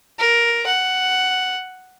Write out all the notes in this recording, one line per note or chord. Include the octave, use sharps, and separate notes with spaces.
A#4
F#5